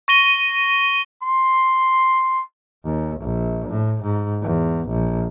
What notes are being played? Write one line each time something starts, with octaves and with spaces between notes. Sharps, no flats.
C#6 A#6 D#7 G7
C6
D#2
A#1
A2
G#2
E2
A#1